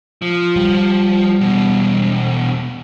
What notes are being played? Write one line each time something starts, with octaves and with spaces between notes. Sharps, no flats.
F3
G3
E2 B2